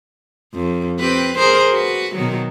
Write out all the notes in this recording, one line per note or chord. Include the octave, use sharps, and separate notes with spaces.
F2
C4 G4 B4
G#4 A#4 C5
F#4 B4
B2 D#3 F#3